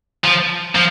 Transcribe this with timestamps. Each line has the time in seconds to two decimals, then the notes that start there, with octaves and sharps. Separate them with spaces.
0.24 F3
0.75 F3